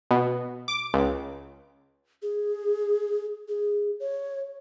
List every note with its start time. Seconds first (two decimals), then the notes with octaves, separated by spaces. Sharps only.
0.11 B2
0.68 D6
0.94 C#2
2.22 G#4
3.49 G#4
4.00 C#5